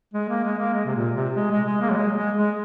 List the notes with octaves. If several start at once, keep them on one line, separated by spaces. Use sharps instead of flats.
G#3
A#3
G#3
A#3
G#3
C3
A#2
C3
G#3
G#3
G#3
A#3
F#3
G#3
G#3
G#3